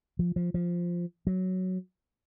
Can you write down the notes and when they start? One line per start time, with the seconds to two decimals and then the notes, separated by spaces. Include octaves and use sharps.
0.19 F3
0.36 F3
0.54 F3
1.27 F#3